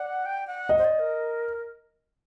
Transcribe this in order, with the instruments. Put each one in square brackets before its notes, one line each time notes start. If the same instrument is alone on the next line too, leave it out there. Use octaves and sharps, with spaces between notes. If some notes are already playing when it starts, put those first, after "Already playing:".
Already playing: [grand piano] D5 [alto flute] F#5
[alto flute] G5
F#5
[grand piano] D#5
[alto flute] C5
D5
A#4